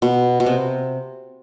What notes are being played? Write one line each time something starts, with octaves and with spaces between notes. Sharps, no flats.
B2
B2
C3